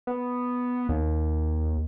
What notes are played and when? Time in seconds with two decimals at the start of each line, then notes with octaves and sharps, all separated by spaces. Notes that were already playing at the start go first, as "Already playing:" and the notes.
0.07 B3
0.89 D#2